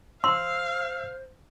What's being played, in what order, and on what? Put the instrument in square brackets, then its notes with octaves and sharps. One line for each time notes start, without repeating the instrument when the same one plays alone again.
[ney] C5 [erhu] F5 [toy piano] C6 [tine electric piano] E6